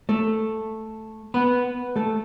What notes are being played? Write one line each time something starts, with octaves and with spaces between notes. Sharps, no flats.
A3 A4
B3 B4
A3 A4